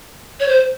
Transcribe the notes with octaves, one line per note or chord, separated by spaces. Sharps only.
C#5
C5